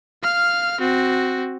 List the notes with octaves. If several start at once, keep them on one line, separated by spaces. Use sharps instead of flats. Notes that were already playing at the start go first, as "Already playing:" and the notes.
F5 F6
C4 F#4